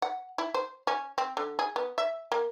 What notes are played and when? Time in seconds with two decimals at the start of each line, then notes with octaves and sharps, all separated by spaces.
0.02 F#5
0.38 E4
0.54 C5
0.87 C#4
1.18 C4
1.37 D3
1.59 G#4
1.76 B3
1.98 E5
2.32 A#3